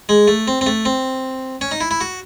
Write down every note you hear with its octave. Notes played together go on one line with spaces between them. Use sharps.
G#3
A3
C4
C4
A3
C4
C#4
D#4
E4
E4
F#4